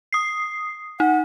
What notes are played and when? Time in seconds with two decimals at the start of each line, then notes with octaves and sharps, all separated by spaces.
0.13 D#6 C7
1.00 D#4 F#5